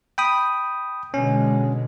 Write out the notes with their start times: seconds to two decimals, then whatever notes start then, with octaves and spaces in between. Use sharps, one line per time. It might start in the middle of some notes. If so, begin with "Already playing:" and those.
0.18 G5 B5 D#6
1.14 B2 D3 G#3 C#4